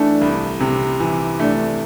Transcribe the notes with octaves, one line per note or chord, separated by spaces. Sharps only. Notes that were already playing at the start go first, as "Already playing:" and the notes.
Already playing: E3 A3 D4
C2
C3
E3
A3 D4